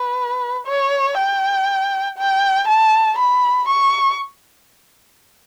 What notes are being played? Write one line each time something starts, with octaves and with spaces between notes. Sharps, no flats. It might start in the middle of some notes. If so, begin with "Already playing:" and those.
Already playing: B4
C#5
G5
G5
A5
B5
C#6